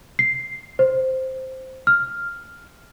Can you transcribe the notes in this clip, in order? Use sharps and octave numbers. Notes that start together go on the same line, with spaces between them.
C7
C5
F6